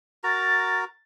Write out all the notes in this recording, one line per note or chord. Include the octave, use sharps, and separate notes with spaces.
F#4 A#4 A#5 A6